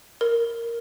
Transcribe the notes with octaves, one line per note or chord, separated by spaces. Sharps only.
A#4